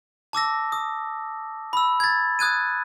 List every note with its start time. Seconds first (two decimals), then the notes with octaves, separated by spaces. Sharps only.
0.33 A5 D6 E6 A#6
0.72 D#6
1.73 B5 E6
2.00 G#6 A6
2.39 D#6 F#6 G#6 D#7